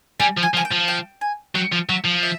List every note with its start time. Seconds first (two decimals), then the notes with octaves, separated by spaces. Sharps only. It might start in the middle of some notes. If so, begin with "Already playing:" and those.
0.20 G3 G#5
0.37 F3
0.43 G#5
0.54 F3
0.57 G#5
0.65 G5
0.71 F3
0.88 G5
1.21 G#5
1.55 F#3 G5
1.72 F3
1.89 F#3 E5
2.05 F3
2.23 E5